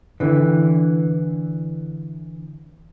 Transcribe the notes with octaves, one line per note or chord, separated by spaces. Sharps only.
D3 E3